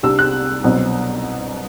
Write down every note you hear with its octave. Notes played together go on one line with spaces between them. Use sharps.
C2 C3 G3 D4 E6
F#6
C2 B2 F#3 C4